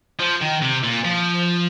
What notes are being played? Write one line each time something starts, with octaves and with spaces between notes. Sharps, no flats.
F3
D#3
C3
A#2
F3